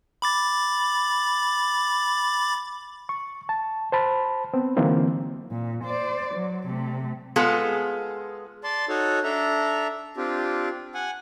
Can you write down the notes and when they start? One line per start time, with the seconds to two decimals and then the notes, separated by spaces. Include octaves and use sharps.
0.22 B5 D6 A6
3.09 C#6
3.49 A5
3.92 C5 A5 B5
4.54 B3 C4
4.77 D3 E3 F#3 A#3 C4 D#4
5.51 A#2
5.84 C5 D5
6.34 F#3
6.67 C3 A3
7.36 G#3 B3 F4 G#4 A4
8.64 D5 A5 C6
8.89 D#4 F#4 A4 C#5
9.24 D4 A4 E5 A#5
10.17 C4 D4 F4 G4
10.95 F#5 G#5